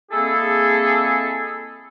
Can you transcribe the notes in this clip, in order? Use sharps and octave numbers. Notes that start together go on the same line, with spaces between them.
G#3 A#3 C4 E4 G#4 A4